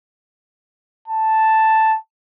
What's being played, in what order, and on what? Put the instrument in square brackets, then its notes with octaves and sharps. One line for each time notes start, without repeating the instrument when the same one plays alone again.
[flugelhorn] A5